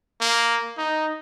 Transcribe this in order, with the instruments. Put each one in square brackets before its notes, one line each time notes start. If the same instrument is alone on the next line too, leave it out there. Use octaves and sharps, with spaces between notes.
[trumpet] A#3
D#4